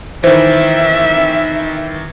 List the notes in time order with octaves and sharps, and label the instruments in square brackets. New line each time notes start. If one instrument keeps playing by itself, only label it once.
[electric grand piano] D#3 E3 [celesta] C5 [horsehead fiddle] E5